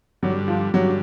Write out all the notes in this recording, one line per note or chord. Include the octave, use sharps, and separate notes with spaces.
G2 D3 F#3 G3
F3
G2 D3 F#3 G3